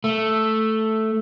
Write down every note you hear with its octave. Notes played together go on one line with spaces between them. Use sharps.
A3